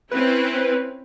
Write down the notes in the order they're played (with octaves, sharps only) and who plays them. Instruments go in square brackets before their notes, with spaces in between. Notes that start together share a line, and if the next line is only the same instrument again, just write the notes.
[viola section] C4 C#4 E4 [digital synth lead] B4